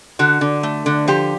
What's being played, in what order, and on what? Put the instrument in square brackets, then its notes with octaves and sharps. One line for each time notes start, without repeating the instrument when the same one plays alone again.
[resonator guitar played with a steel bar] D3 F#4
D3
A3
D3
F3 G4